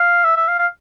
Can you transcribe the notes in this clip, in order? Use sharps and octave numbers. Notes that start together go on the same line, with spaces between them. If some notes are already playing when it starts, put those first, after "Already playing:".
Already playing: F5
E5
E5
F5
F5